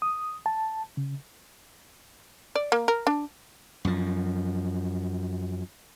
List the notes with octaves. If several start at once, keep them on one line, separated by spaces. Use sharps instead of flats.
D#6
A5
C#3
D5
A#3
A#4
D4
F#2 F3